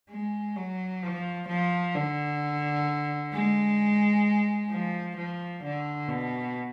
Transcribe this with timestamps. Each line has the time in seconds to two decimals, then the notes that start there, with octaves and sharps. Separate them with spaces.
0.11 G#3
0.56 F#3
1.03 F3
1.48 F3
1.95 D3
3.33 G#3
4.71 F3
5.17 F3
5.63 D3
6.08 B2